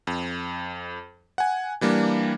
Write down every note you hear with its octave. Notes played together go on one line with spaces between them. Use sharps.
F2
F#5 G#5
E3 G3 A#3 D4